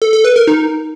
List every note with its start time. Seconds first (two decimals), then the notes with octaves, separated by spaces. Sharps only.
0.02 A4
0.13 A4
0.25 B4
0.36 A#4
0.47 D#4